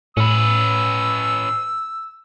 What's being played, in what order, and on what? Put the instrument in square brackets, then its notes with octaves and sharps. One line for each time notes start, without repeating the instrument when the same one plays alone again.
[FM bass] A2 [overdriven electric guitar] C#4 B4 [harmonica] E6